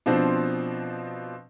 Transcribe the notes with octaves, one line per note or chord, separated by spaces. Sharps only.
B2 F3 C4 D4